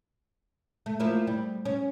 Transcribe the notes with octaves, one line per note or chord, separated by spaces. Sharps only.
A3
F3 A#3 E4
G3
C#4